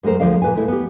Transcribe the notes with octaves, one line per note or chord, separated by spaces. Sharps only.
F#2 G#3 A3 A#4 C5
D2 A#2 F3 G#3 D5 F5
A#2 B4 G#5
G#3 A3 E4
B3 G4